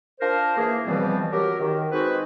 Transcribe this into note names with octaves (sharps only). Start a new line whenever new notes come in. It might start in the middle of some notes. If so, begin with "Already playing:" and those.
D4 F4 A#4 C5
E3 A#3 G#4
C#2 B2 E3 F3 G3 C4
F#3 G4 A#4
D#3
G#3 C4 D#4 F#4 B4